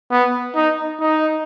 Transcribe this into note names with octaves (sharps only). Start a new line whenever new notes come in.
B3
D#4
D#4